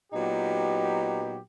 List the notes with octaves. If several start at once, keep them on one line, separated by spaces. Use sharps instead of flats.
A#2 F#3 B3 D#4 G4